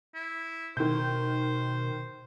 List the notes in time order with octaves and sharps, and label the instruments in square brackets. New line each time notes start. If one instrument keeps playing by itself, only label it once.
[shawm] E4
[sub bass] B2 [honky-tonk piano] D#3 G6 [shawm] C5